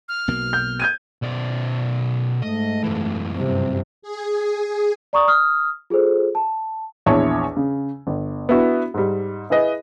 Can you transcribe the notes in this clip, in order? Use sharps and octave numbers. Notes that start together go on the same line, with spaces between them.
F6
B1 B2 A#3
G6
G6 G#6 D#7
B1 D5
G#2 A3 D#5
F#2 E3
G2 C3
G#4
D5 A#5 C#6 D#6
D#6 F6
F4 G#4 A4 C5
A5
A#1 E2 E4 C#5 A5
C#3
G1
B3 D4 E4 F#4
G#2 G3
E4 G#4 B4 D#5